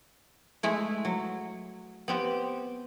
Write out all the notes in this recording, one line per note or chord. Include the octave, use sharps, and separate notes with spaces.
G#3 A3 E4
F#3
B3 C4 G4